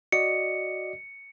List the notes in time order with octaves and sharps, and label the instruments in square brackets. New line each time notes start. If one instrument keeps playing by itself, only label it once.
[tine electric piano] F#4 D5 D#5 [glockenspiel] C#7